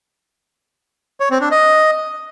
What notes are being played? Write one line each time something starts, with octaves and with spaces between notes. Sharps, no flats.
C#5
C4
D4
D#5